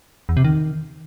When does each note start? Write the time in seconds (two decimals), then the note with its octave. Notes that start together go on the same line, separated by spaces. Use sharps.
0.29 E2
0.37 C3
0.44 D#3